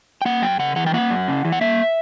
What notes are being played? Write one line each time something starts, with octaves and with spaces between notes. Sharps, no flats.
G5
A#3 F#5
F#2 G5
C#3 F#5
E3 F#5
G5
A#3 F#5
F#2
C#3
E3
F#5
A#3 E5